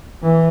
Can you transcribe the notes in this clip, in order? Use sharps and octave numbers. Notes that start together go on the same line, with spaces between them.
E3